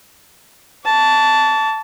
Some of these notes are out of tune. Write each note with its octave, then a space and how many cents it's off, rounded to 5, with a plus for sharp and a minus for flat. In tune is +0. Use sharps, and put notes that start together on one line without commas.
A5 +0 C#6 +45